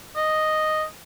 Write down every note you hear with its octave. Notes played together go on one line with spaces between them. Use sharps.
D#5